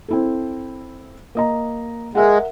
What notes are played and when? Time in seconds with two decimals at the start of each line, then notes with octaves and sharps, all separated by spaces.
0.08 C4 E4 A4
1.35 A#3 D#5 A#5
2.15 G#3 A#4 E5 F#5